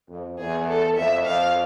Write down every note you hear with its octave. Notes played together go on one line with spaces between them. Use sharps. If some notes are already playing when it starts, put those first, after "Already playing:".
F2
E2 G#4
A4
F2 E5
F2 F5